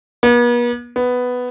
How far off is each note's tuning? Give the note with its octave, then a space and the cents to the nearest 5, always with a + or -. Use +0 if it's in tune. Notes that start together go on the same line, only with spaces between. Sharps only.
B3 -45
B3 +5